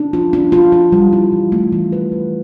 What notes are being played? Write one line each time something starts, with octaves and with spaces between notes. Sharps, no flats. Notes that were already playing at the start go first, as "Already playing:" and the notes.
Already playing: D4
F4
D4
F4
F4
G3
E4
E3
A3
E3
B4
E3